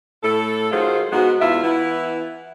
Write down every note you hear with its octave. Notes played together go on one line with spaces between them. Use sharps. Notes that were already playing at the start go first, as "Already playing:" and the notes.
A2 A4
D#3 F#3 G#3 F4 C5
G#2 G#3 B3 F#4
E2 E4 F4 E5
E3 B3 E4